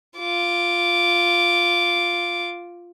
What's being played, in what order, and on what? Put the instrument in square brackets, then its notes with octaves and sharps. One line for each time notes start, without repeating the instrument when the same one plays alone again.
[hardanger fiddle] F4 D6